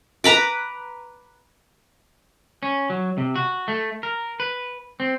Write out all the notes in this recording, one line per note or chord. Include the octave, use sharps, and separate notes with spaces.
B4 A#5 B5 D6
C#4
F#3
C3
F#4
A3
A#4
B4
C4